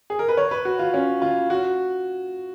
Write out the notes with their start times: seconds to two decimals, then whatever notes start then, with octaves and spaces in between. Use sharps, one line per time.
0.10 G#4
0.19 A#4
0.28 B4
0.37 C#5
0.51 B4
0.65 F#4
0.79 F4
0.94 C#4
1.22 F4
1.50 F#4